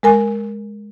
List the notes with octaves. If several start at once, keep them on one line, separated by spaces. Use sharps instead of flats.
G#3 A#4 G#5